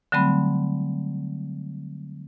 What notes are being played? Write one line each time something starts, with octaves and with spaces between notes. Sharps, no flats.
D3 F#3 G3 A3 C4 B5